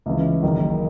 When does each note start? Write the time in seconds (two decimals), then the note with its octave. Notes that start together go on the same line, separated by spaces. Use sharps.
0.06 C#2 C#3 E3
0.43 F#1 F#2 D#3